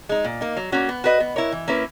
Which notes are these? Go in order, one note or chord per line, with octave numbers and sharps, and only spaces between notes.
G#3 D#4
A#2
A#3 D#4
F#3
A#3 C#4 F#4
B3
F#4 B4 D#5
B3
E4 A#4 C#5
E3
A#3 C#4 E4 B4